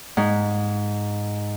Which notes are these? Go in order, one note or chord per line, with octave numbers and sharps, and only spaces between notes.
G#2